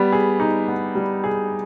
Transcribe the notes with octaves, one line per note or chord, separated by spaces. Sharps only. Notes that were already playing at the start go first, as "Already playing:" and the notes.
Already playing: G3 B3
G#4
D#4
B3
G3
G#4